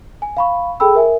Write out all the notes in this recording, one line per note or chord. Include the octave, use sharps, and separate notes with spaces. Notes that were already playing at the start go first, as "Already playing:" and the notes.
G#5
F5 B5 C#6
G#4 A4 G5 B5 E6
A#4 E5 G#5